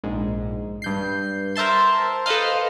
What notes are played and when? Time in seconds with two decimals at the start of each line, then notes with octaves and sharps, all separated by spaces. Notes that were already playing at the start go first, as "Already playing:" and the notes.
0.04 A#1 G#2
0.82 G2 G6 C7
1.56 A#4 C5 E5 A5 C6
2.26 A4 B4 C5 D#5 F5